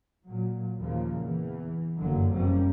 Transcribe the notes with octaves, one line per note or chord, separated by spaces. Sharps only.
A#2 F#3
D#2 A#2 C#3 F3 A#3
E2 E3
F#1 G2 D3 F#3 A#3
F#1 C3 G3 A#3 C#4